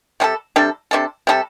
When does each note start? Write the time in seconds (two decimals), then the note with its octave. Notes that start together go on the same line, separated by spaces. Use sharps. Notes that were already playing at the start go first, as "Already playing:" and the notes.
0.20 C3 G3 D4 A4
0.56 C3 G3 D4 A4
0.91 C3 G3 D4 A4
1.27 C3 G3 D4 A4